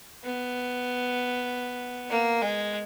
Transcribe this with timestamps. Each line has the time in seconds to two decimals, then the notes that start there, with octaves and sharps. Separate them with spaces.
0.24 B3
2.10 A#3
2.42 G#3